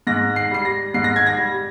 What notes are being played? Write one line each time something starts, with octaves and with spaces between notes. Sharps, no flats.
G#2 A#6
C7
G3 C7
A#6
G#2 C7
A#6
G#6
A#6
G3